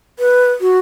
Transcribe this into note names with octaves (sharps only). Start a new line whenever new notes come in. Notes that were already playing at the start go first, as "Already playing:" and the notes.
B4
F#4